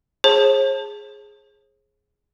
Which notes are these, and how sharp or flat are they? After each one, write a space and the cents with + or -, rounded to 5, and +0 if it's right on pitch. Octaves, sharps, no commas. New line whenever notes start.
G#4 +0 C5 +45 A5 +10